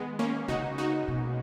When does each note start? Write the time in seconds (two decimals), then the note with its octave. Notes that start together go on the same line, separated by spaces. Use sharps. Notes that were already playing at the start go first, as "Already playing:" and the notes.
Already playing: D#3 G#3 B3
0.19 A#3 C#4
0.48 C#3 D#4 F#4
0.78 D#4 F#4
1.08 B2